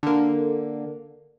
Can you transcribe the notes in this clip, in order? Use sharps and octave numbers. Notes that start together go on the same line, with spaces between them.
D3 A#3